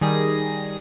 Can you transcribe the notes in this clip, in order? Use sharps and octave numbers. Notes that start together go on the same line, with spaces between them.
D#3 G3 G#4 A#6